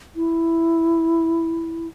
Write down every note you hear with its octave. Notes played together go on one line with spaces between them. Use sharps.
E4